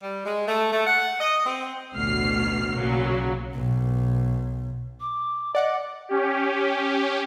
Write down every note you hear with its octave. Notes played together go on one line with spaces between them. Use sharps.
G3
G#3
A3
A3
F#5
D#5
C4
A1 D2 B2 F6 C7
B1 A#2 C#3 F#3
B1
D6
D5 D#5 F#5 D6
C#4 G4